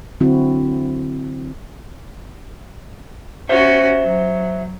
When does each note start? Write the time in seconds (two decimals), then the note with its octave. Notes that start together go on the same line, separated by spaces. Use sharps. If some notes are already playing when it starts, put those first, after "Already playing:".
0.21 D3 F#3 C4 E4 F#4
3.49 C#4 F#4 C5 E5
4.00 F#3